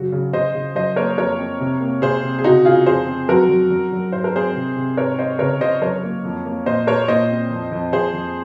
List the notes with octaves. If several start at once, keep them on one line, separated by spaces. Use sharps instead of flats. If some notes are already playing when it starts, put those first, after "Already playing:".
Already playing: F#2 C#3 F#4
C#3
C#3 C5 D#5
C#3
F#2 C5 D#5
A#3 A#4 C#5
F2 A#4 C#5
C4
C3
A#3
C3 G#4 C5
C3
G#4
C#3 D#4 F#4
C#3 F4 G#4
F2 G#4 C5
C4
F#2 F#4 A#4
F#2
F#2
F#2
G#2 C5
A#4
C4 G#4 C5
C3
C3
G#2 A#4 C#5
C4 C5 D#5
C#3 A#4 C#5
C#3 C5 D#5
F#2 A#4 C#5
A#3
F2
A#3
A#2 C5 D#5
A#2 A#4 C#5
A#2 C5 D#5
C4
F2
F2
F2 G#4 C5
F2